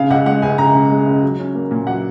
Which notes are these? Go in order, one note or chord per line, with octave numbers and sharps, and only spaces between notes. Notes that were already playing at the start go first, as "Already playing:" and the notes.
Already playing: C#3 F5
C#2 F#5
G#3 F#5
C#2 G#5
C#3 A#5
C#2
G#3
C#2
F#3
C#4
A#3
A#2
F#3 F#5